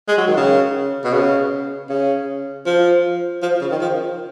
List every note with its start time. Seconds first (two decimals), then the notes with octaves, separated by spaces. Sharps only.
0.08 G#3
0.18 F#3
0.27 D#3
0.37 C#3
1.04 B2
1.13 C#3
1.89 C#3
2.66 F3
3.42 F3
3.61 C#3
3.71 D#3
3.81 F3